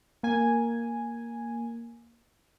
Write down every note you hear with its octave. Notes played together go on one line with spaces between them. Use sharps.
A#3 G#5